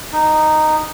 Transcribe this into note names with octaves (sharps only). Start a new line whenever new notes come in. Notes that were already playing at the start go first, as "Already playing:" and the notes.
D#4